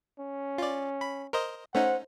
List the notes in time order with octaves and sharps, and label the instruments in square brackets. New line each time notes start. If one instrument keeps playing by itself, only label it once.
[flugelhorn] C#4
[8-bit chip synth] F4 D5
B5
A#4 C5 D#5
[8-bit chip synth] A3 C#4 D#4 [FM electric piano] C5 [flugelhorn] F#5